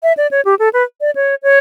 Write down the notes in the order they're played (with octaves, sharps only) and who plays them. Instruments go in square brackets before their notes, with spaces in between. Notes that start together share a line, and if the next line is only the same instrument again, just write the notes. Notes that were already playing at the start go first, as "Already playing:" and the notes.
[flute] E5
D5
C#5
G4
A4
B4
D5
C#5
C#5